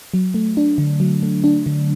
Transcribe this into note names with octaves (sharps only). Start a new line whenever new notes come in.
F#3
A3
D4
D3
F#3
A3
D4
D3